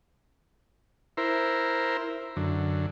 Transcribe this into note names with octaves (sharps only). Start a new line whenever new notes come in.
E4 A#4 C5
F#2 D3